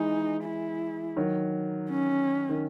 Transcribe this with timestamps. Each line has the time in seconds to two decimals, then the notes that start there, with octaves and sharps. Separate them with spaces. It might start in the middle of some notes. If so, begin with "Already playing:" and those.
Already playing: E3 G#3 D#4
0.43 E4
1.16 D#3 F#3
1.89 C#4
2.49 D#3